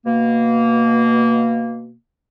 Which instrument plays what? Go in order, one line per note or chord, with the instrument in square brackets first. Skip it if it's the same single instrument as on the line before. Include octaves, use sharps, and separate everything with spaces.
[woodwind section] B2 A#3